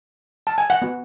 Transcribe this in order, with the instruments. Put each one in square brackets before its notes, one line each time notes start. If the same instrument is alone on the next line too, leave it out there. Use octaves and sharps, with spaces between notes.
[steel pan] A5
G#5
F#5
B3 F#4